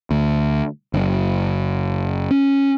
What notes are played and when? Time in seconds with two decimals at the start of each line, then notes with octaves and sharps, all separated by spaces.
0.11 D2
0.94 F#1
2.31 C#4